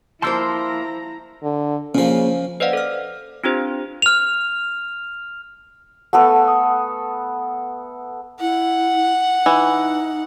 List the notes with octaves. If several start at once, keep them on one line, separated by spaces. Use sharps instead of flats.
F3 A#3 E4 C5 A5 A#5 C6 E6
D3
A#2 C#3 F3 A#3 C#4
B4 C5 D5 D#5 F5 F#5
A4 F6
C4 D4 F4 G4 C5
F6 F7
A3 B3 A4 F#5
F#5 D#6
E4 F#5
E3 D#4